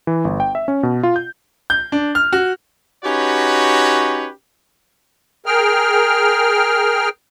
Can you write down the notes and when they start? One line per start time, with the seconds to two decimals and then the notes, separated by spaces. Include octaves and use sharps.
0.07 E3
0.25 G1
0.40 G5
0.55 E5
0.68 C#4
0.83 B2
1.03 F4
1.16 G6
1.70 G6
1.92 D4
2.15 F6
2.33 F#4
3.04 C#4 D#4 F#4 G4 B4 C#5
5.46 G#4 A#4 G5 F6